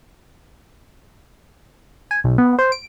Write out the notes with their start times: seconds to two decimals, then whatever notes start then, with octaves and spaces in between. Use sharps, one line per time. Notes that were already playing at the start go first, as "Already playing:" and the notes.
2.11 G#5
2.24 B1
2.38 B3
2.59 C5
2.72 D7